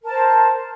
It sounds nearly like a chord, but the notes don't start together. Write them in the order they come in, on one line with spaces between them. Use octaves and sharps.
A#4 A5 C5